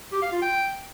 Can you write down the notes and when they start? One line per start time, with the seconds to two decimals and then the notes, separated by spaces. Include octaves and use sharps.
0.12 G4
0.22 F5
0.32 F4
0.42 G5